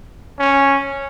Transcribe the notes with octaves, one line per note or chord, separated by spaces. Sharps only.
C#4